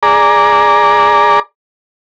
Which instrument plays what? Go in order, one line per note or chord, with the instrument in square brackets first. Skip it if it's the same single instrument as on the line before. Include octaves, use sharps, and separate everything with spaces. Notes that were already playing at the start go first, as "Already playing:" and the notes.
[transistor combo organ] G#4 D5 A#5